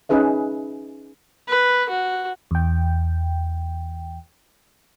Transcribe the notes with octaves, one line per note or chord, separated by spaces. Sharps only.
C#4 D#4 G#4 B4 E5
B4
F#4
E2 G5